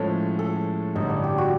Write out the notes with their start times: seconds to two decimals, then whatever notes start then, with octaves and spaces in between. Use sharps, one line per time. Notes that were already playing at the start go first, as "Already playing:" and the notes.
Already playing: A2 F3 G#3 C#4 A4
0.39 A4
0.95 A1 G2 D3 G3 D#4
1.10 D4
1.24 G4
1.38 F#4